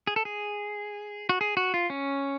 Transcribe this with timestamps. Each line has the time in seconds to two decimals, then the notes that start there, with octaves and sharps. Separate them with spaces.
0.07 G#4
0.16 A4
0.25 G#4
1.29 F#4
1.41 G#4
1.57 F#4
1.74 F4
1.90 C#4